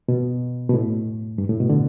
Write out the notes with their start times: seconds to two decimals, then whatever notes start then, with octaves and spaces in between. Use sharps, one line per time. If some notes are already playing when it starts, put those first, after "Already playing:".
0.08 B2
0.70 B2
0.74 A2
1.38 G2
1.49 A2
1.60 B2
1.70 D3